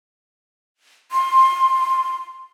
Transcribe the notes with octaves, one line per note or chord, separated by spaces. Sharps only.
C6